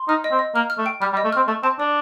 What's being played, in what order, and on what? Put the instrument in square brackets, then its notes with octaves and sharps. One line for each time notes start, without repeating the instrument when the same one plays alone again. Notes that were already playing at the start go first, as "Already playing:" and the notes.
Already playing: [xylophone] C6
[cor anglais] D#4 [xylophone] F6
[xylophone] D#5
[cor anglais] C4
[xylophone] D#5
[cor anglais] A#3 [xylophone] F6
[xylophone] F6
[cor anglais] A3
[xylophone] G5
[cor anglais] G3 [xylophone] F6
[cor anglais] G3
[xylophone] D#5
[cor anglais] A3
[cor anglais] C4 [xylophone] F6
[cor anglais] A3 [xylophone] A5
[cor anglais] C4 [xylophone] A5
[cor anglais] D4 [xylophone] D5